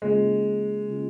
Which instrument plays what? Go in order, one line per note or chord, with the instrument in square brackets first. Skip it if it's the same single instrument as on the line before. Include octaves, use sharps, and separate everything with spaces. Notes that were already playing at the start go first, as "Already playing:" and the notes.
[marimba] C#3 A#3 C#4 F4 [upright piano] G#3
[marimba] C#3 A#3 C#4 F4